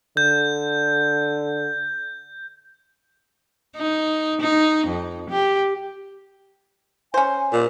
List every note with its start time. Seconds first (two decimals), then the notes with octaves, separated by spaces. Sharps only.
0.17 D3 G6
3.76 D#4
4.41 D#4
4.87 F2
5.30 G4
7.14 C#4 C5 G#5
7.53 A#2